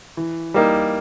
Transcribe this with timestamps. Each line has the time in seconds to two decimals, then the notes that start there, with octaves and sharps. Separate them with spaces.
0.17 E3
0.54 G3 A#3 D#4